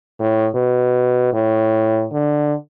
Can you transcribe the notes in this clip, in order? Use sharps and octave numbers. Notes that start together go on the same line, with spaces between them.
A2
B2
A2
D3